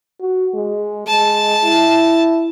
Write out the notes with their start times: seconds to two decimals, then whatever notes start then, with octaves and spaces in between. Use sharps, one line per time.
0.21 F#4
0.54 G#3
1.08 G#3 A5
1.64 E4